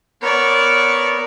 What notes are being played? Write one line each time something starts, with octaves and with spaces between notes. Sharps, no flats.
B3 A#4 B4 C#5 D5